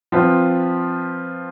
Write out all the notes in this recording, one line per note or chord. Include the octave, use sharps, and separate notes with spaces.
F3 C4 F4 B4